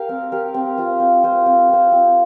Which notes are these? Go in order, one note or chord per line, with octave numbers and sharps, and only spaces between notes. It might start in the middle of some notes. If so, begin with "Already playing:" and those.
Already playing: G4 A#4 F5
C4
G4 A#4 F5
C4
F4 C5
C4
F4 C5
C4
F4 C5
C4